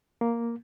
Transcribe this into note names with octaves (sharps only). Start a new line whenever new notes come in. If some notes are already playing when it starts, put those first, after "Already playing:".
A#3